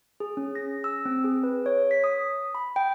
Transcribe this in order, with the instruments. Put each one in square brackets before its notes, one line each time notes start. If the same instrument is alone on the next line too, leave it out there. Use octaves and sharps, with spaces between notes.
[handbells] G#4
C#4
A#6
E6
C4
G#4
B4
C#5
B6
D#6
B5
G5